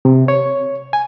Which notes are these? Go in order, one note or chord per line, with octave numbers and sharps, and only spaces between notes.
C3
C#5
G#5